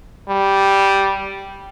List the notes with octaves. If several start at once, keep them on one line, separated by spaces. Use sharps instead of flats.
G3